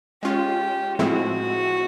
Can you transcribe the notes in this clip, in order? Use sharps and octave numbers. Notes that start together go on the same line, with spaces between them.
G#3 C#4 F4 G4
A2 F3 G#3 C4 E4 F#4